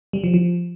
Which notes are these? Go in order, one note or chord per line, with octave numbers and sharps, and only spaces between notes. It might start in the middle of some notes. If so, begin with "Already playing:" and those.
G3
F3
F3